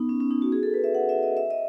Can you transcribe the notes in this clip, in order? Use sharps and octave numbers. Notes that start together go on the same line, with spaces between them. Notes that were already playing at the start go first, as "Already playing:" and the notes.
Already playing: B3 D#4
C#4
C#4
D#4
F#4
G#4
A4
B4
E5
F#5
E5
D#5
E5
D#5